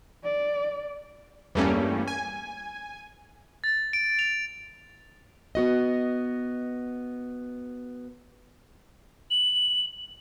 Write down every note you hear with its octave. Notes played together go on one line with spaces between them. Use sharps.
D5
E2 G2 G3 A3 A#3 C#4
G#5
A6
D7
F7
B3 F#4 D#5
F#7